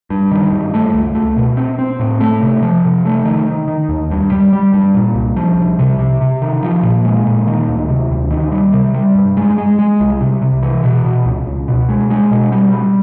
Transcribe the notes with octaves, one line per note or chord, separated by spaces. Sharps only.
G2
D#3
G2
A3
C#2
A3
B2
C4
C4
A2
A3
C3
F3
C3
A3
D#3
D#3
D#3
D#2
G2
G3
G3
G2
A#2
C2
F3
C2
C3
C3
C3
D#3
F3
A#2
G#3
A#2
D#3
D2
C3
D2
D#3
G3
C3
G3
G2
G#3
G#3
G#3
C2
C3
C3
E3
B2
B2
C#2
C#2
B2
G#3
G#3
B2
G3
G3